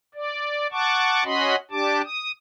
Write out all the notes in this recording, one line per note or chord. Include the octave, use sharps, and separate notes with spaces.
D5
F#5 A5 C#6 D6
C#4 F#4 D#5 B5 C6
D4 G4 A5 D6
D#6